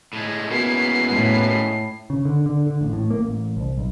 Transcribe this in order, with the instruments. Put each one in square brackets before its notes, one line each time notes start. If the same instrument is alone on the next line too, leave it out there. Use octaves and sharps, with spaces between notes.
[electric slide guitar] A2 G#3
[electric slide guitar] G#3 C#4 E4 [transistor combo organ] A#3 B3 F#4 [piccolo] C7
[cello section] A2
[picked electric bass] C#3
D3
D3
D3
A1
A2
A#3
A1
C2
B1